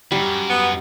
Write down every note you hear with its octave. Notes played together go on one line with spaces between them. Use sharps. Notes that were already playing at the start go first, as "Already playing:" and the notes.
F#2 G3
B3